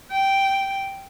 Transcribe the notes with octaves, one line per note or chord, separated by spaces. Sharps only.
G5